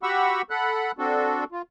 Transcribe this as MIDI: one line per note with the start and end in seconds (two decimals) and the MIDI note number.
0.03 0.42 66
0.03 0.42 67
0.03 0.42 78
0.03 0.42 83
0.03 0.42 85
0.03 0.42 88
0.50 0.92 69
0.50 0.92 78
0.50 0.92 83
0.50 0.92 90
0.98 1.44 60
0.98 1.44 62
0.98 1.44 66
0.98 1.44 69
1.52 1.62 65